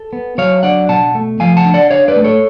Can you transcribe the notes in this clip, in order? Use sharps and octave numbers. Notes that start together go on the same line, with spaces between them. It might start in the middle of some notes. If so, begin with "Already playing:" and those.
Already playing: A4
B3
F#3 C#5 F5
D4 D5 F#5
B2 F#5 A5
A3
F3 F5 G#5
F#5 A5
D4
D5 F#5
D4 C#5 F5
B4 D5
A3
A4 C#5